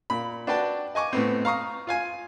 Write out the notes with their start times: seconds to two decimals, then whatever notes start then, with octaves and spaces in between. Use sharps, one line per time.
0.10 A#2 B5
0.47 D4 F#4 B4 D5 G5 A5
0.95 D#5 G#5 C#6 D6
1.13 A2 B3 C4
1.45 F5 A#5 C#6 D#6
1.87 F4 F5 G#5